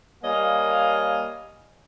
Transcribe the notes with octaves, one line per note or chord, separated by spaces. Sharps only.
G3 A#3 C#5 D#5 F5 G#5